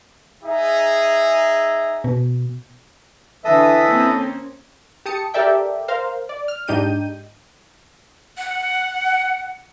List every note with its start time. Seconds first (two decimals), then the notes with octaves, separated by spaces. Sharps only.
0.44 D#4 G#4 E5
2.04 B2
3.45 D3 E3 A4 D#5 E5 D#6
3.86 A#3 C4 C#4
5.06 G4 A5 D#6 C#7
5.34 G4 A4 A#4 D5 E5 G5
5.88 A#4 C5 F5
6.29 D5
6.48 F6
6.68 G#2 D4 D#4 G4 G6 D#7
8.38 F#5